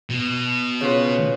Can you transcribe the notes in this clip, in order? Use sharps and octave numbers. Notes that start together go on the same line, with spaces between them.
B2
C#3 F4 B4